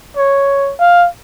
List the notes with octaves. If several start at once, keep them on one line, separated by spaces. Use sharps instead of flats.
C#5
F5